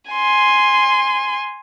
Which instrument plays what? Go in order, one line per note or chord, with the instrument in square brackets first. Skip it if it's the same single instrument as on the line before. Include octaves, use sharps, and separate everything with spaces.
[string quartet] G#5 C6